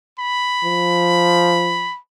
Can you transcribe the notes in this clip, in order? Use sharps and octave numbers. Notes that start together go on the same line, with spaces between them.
B5
F3